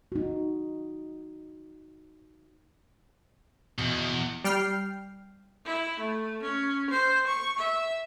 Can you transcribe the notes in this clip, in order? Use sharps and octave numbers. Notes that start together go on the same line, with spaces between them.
D#4 F#4
E2 B2
G3 G5 F6 C7
E4
A3
C#4
C5
C#6
E5